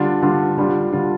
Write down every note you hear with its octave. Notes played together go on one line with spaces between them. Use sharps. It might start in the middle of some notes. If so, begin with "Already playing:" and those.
Already playing: D3 G3 D4 F4
D3 G3 D4 F4
D3 G3 D4 F4
D3 G3 D4 F4